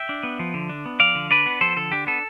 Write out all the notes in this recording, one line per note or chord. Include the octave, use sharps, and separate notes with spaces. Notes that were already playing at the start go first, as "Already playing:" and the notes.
Already playing: E5 G5
D4
B3
F3
D3
D4
B3
F3 D5 F5
D3
D4 B4 D5
B3
F3 A4 C5
D3 A4
D4 G4
B3 A4